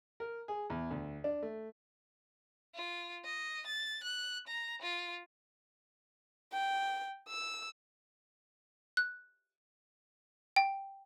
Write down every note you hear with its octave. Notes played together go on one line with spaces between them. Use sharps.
A#4
G#4
E2
D2
D4
A3
F4
D#5
A6
F#6
A#5
F4
G5
E6
F#6
G5